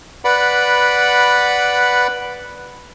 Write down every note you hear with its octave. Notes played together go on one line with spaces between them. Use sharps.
B4 D5 F#5 B5